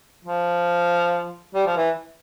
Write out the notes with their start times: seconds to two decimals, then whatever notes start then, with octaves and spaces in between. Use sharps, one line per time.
0.25 F3
1.55 G3
1.66 F3
1.77 E3